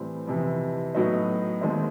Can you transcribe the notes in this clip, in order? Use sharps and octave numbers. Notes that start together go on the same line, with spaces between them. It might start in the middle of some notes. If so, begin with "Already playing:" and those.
Already playing: A2 E3 G3 C4
F2 C3 E3
A2 F#3 B3 D#4
D#2 D#3 G#3 C4 D#4